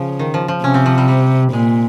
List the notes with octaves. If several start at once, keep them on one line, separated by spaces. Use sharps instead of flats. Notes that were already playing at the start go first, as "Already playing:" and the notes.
Already playing: C#3 F3
D#3
F3
F3
C3 C#4
C4
F3
G3
G3
A#2 G#3